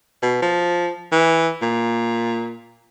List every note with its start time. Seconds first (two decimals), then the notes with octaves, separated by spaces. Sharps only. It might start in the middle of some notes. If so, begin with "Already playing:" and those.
0.22 B2
0.42 F3
1.12 E3
1.62 A#2